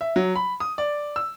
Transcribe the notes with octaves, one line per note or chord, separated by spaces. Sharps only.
E5
F#3
B5
D#6
D5
E6